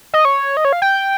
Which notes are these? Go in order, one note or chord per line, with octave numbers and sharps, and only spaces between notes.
D#5
C#5
D#5
C#5
F5
G5